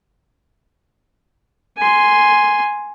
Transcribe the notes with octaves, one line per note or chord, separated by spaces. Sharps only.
G#5 C6